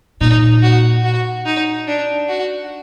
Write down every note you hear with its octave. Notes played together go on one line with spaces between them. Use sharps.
A#2 D#4
F#4
F#4
D#4
D4
F#4